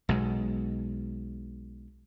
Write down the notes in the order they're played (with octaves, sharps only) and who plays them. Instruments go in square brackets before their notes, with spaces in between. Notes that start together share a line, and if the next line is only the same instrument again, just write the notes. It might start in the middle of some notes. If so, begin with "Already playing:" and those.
[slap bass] B1 B2 G#3